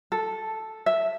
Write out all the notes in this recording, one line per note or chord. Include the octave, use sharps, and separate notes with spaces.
A4
E5